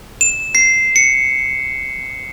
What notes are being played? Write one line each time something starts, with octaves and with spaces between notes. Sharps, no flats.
E7
C7
C#7